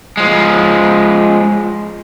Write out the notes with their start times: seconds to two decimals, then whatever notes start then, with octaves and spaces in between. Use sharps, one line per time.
0.17 F3 G#3